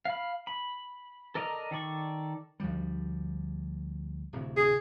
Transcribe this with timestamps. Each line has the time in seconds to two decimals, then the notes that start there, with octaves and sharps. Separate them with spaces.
0.05 F5 B5
0.47 B5
1.35 A4 A#4 D5 D#5 A#5
1.71 D#3 A4 D5 C#6
2.60 D2 F3 G3
4.33 D1 D2 C3
4.56 G#4